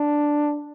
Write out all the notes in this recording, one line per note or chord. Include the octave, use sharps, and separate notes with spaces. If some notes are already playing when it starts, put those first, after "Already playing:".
Already playing: D4